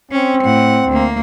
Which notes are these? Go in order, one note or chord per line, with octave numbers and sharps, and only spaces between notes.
C4 C#4
A2 F#5
D2 A#3